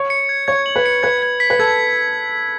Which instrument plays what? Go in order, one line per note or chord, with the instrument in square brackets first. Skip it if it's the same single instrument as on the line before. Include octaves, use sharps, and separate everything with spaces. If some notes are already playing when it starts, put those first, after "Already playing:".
Already playing: [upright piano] C#5
[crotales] C#7
G#6
[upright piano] C#5 [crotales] G#6
[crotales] F#7
[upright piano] B4
[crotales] C#7
[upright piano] B4 [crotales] G#6
[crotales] G#6
B6
[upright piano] B4
[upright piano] A4 [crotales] G#6